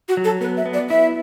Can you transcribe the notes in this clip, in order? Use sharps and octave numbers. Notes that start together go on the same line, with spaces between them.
F#4
F#3
A4
B3 B4
E5
B3
D5
E4 E5